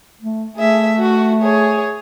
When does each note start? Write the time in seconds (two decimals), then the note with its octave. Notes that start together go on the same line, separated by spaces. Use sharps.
0.21 A3
0.56 A3 G#4 E5
0.98 F#4
1.43 G#4 C#5